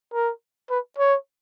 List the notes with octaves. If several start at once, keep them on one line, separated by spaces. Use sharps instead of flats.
A#4
B4
C#5